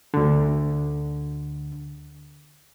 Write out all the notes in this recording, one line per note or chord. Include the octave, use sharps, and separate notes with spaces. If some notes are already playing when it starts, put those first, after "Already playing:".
D2 D3